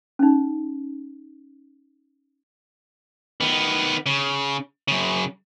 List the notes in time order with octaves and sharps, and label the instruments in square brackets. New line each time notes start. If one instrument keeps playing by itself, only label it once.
[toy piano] C#4 D#4
[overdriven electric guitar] D#3 B3
C#3
F#2 C#3